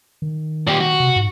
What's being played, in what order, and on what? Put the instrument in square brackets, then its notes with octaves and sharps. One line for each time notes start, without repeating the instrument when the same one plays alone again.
[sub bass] D#3
[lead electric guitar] A#2 G4
F#4
[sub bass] C3
G#2